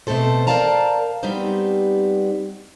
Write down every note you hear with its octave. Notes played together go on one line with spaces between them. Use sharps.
B2 A3 C4 A4 C5
A#4 C5 D5 F5 A5 A#5
G3 B3 C4 D#4 G4 C5